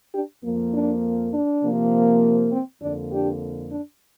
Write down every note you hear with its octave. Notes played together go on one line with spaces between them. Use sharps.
D4 G4
F2 F3 A#3
D4
D4
C3 F3 A#3
C4
F2 D3 A#3 D4
D4 G4
D4